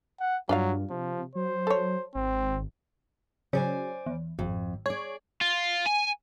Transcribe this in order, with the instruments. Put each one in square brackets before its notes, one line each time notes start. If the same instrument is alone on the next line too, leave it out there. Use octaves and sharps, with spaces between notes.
[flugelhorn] F#5
[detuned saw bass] G2 [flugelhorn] F#3 [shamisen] D4 F4 F5
[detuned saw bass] C3 [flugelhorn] F3
[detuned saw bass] F#3 [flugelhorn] C5
[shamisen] A4 C#5
[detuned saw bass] G#1 [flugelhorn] C4
[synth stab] C#3 F#3 C#4 [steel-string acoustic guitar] C5 D5 G#5
[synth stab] E2
[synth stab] G#1 [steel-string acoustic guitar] F2
[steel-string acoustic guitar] G#4 D5 [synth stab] C#5
[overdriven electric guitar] F4
G#5